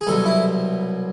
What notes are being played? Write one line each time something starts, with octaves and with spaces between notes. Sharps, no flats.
G#4
C2 B2 F#3 A4
E4